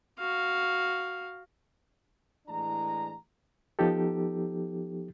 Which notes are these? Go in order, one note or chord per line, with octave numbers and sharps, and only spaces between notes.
F#4 F5
A2 E3 G#3 D4 A#5
F3 B3 D#4 G4 A4